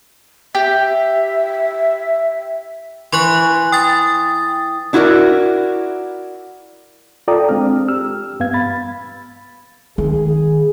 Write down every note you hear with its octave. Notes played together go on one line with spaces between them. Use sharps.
G4 E5
E3 C6 C#6 F#6
G5 D#6 A6
D4 E4 F#4 A4 A#4 D5
F4 A4 D5 G5 A#5 D#6
G#3 C4 D4 F6
G4 E6 F6
G2 B3 F5 G#6
B5 A6
D#3 G#4